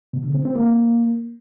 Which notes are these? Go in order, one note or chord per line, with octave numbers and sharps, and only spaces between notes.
B2
D3
C4
C4
A#3